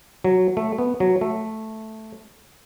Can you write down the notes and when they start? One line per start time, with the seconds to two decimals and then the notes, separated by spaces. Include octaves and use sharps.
0.24 F#3
0.57 A3
0.78 B3
1.00 F#3
1.21 A3